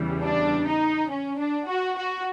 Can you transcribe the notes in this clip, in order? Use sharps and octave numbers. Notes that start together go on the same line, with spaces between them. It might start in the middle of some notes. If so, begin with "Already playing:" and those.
Already playing: E2 C#3 E3 G3
D4
D#4
C#4
D4
F#4
F#4